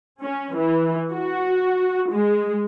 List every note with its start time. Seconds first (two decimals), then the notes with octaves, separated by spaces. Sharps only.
0.22 C#4
0.56 E3
1.12 F#4
2.11 G#3